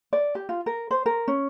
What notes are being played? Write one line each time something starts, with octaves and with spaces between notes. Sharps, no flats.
D5
G4
F4
A#4
C5
A#4
C#4